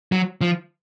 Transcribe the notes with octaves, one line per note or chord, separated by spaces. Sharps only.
F#3
F3